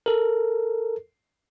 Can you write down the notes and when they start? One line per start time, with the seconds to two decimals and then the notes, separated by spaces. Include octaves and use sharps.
0.06 A4 A#4